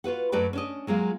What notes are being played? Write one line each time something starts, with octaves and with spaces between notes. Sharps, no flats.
F4 F#4 B4 F#5
F#2 F#3 A3 D4 B4 D5
C#4 D4 D#5
F#3 G#3 A#3 F4